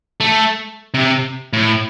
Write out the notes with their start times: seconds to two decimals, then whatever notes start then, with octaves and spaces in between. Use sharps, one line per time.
0.20 A3
0.94 C3
1.53 A2